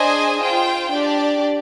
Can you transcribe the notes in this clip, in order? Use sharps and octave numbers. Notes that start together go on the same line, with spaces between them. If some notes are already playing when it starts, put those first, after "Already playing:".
Already playing: D4 G#4 C5 D#5 G#5
F4 C5 G5
D4 G4 D5